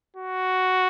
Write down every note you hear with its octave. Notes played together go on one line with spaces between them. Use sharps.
F#4